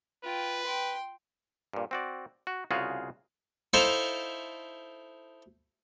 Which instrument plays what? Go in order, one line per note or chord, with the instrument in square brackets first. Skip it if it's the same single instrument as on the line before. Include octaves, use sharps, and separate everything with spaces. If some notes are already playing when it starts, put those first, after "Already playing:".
[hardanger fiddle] F4 G5 [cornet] B4
[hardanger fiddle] G5 C6
[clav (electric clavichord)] G2 A#2
C4 F#4 D5
F#4
C2 C#3 F4 F#4 G#4 F5
[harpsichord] D#4 E4 A4 C5 E5 F5